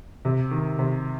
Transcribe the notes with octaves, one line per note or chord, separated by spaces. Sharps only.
C3
D#3
C3